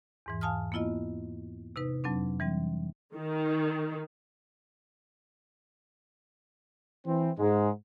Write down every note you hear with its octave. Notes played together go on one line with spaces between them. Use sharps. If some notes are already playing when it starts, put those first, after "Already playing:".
E2 G#2 E3
F5 G#5 A5 D#6 F6
A#3 B3 E4 F4 D#5
C3 D#4 B4
F2 F#3 C4 D4
E3 G3 C4
D#3
E3 C4
G#2 G#3